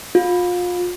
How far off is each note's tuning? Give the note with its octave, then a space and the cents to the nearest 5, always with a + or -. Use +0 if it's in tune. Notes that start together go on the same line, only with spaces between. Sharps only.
F4 +30